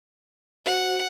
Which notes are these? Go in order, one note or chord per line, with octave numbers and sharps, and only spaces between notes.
F#4 C5 F#5